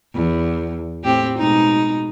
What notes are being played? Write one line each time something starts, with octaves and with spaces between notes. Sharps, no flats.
E2
A2 C4 G4
B2 G#3 D#4